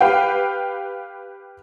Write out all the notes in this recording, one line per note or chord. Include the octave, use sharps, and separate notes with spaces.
G4 B4 F5 G5